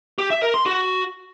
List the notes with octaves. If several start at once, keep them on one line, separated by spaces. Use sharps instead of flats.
G4
E5
A#4
C6
F#4